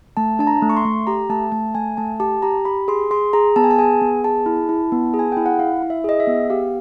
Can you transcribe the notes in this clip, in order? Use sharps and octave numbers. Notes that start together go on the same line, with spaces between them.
A3 A5
D4 A5
A#5
A3
C#6
C6
A3
G4 A#5
A3 A5
A3 A5
A3 G#5
A3 A5
G4 A5
G4 A#5
G4 B5
G#4 C6
G#4 C6
G#4 A#5
B3 A5
G#5
A5
G#4 G#5
B3
G#4 A5
E4
E4
B3
G#4
G#5
G5
E4
F#5
E4 F5
E4
E5
G#4 D#5
E5
B3
G4 F5